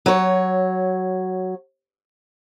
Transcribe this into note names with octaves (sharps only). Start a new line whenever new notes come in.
F#3 C#5